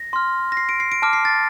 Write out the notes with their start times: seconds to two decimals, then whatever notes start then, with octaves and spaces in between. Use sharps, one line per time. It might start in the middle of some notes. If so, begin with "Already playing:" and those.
Already playing: A#6
0.13 C6 F6
0.52 A#6
0.57 C7
0.69 D7
0.80 C7
0.92 D7
1.02 A5 D6 F6 D7
1.13 C7
1.25 A6